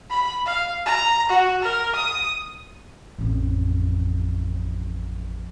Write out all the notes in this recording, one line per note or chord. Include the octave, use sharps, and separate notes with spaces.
B5
F5
A#5
F#4
A#4
D#6
A1 F2